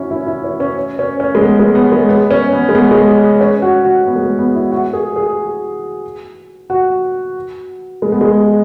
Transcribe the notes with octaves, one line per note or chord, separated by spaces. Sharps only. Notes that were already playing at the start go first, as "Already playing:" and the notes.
Already playing: C#4 E4 F#4
E4
E4
C#4
C#4
C#4
C#4
G#3
B3
G#3
B3
G#3
B3
C#4
B3
G#3
B3
G#3
C#4
F#4
F#4
B3
G#3
B3
B3
E4
F#4
G#4
G#4
F#4
G#3
B3
G#3